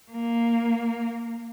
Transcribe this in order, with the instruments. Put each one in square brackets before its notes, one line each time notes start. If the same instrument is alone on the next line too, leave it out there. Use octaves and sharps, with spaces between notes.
[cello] A#3